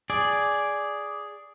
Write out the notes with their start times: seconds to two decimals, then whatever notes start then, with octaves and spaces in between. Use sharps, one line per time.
0.10 G#4 D5